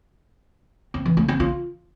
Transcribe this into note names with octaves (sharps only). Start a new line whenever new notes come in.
C4
E3
A3
C4
F4